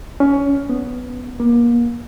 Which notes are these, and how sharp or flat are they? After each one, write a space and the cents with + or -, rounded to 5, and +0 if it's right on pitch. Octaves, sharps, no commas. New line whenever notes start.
C#4 +20
B3 +5
A#3 +30